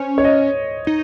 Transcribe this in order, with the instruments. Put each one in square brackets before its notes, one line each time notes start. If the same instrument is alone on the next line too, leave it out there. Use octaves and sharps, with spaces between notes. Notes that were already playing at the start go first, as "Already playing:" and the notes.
Already playing: [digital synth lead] C#4 [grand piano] C5
[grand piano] C#5
D#5
[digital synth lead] D#4